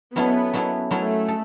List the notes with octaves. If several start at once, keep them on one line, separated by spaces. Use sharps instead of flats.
F#3 B3 C#4 E4 A4
F#3 C#4 E4 A4
F#3 A3 C#4 E4 A4
A4